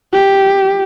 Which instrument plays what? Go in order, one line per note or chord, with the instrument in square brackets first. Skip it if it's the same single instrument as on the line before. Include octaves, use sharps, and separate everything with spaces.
[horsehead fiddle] G4